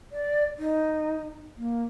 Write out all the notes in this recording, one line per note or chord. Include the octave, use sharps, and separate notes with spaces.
D5
D#4
A#3